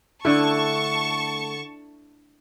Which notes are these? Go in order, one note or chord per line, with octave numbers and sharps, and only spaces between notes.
D3 A3 E4 A5 C#6